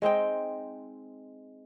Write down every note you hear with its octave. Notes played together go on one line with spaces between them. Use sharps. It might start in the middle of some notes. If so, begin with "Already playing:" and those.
G#3 C4 D#4 G5